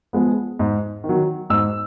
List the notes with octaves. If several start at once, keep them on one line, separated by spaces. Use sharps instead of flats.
F3 G#3 B3
G#2
D#3
F#3
G#2 E6